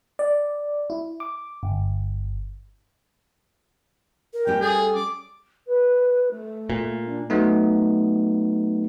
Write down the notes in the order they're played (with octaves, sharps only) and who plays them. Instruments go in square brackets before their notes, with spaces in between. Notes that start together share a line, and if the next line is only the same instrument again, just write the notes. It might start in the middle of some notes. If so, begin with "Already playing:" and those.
[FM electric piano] D5
E4
D6
G1
[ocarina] A#4
[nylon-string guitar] G3 C#4 G4 [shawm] G5
[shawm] G#4 [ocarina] A4
[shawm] D6
[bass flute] B4
A3
[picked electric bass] A#2
[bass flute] D4
[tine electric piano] F#3 A3 B3 D#4